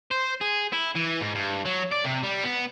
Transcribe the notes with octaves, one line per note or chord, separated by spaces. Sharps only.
C5
G#4
E4
E3
G#2
G2
F#3
D5
C3
G3
B3